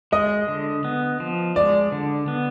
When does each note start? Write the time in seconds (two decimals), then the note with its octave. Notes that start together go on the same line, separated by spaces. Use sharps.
0.12 G#3 D#5
0.48 D3
0.85 B3
1.20 F3
1.56 G#3 D5
1.92 D3
2.28 B3